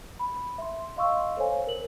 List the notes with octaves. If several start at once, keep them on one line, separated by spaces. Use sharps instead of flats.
B5
E5 C6
D#5 F5 C6 C#6 E6
A4 C5 C#5 F5 G#5
A#4 F#7